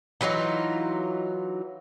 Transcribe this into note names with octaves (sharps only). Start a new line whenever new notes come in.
E3 F#3 D#4 F4